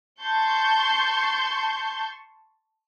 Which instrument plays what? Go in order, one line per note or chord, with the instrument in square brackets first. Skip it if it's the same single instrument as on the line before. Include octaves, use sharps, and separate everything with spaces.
[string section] A5 C6 C#6 G6